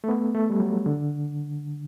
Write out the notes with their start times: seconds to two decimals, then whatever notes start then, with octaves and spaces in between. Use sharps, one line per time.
0.04 A3
0.09 B3
0.35 A3
0.50 G3
0.60 F#3
0.86 D3